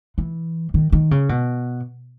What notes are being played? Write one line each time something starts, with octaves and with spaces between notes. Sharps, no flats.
E3
D#3
D#3
C#3
B2